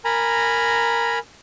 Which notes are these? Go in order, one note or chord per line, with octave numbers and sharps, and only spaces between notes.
A#4 G#5 A#5 B5